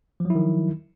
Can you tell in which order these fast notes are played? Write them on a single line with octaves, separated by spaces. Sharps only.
F3 F#3 E4 D#3